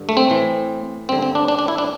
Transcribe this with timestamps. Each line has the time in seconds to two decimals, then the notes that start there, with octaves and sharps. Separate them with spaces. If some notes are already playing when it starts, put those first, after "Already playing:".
Already playing: G2 D3
0.09 A3
0.17 C4
0.30 A2 E3
1.09 G2 D3 C4
1.22 C4
1.35 D4
1.48 D4
1.59 D4
1.68 E4
1.78 D4